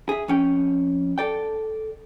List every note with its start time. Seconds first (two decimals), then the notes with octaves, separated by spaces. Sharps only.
0.09 G#4 E5
0.28 F2 C#4 G5
1.18 A4 D5 G5